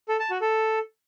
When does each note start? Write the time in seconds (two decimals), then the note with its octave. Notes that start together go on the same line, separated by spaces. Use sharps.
0.09 A4
0.20 A5
0.30 F#4
0.41 A4